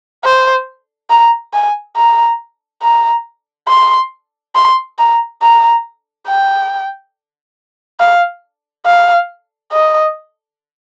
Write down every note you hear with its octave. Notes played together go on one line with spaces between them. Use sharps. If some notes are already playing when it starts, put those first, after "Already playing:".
C5
A#5
G#5
A#5
A#5
C6
C6
A#5
A#5
G5
F5
F5
D#5